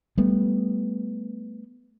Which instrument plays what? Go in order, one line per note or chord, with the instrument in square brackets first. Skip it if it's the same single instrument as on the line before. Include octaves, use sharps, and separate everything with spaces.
[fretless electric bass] G3 A3 B3